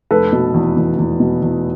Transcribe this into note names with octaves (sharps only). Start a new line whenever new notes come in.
F1 A4 B4
B2
E2
E2
E2
B2
E2